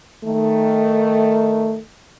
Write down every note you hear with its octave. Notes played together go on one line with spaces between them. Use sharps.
D#3 A3